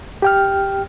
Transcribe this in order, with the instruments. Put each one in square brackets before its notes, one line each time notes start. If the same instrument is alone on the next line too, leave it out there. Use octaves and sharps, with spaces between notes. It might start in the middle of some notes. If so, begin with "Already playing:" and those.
[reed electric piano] G4 G5 F6